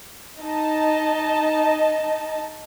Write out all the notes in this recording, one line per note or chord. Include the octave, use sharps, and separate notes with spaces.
D#4 D#5 A5